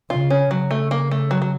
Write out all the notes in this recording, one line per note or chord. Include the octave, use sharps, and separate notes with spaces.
C#3 F4
C#4
C#3 F#3
A3
A#3
A3
F#3
F#3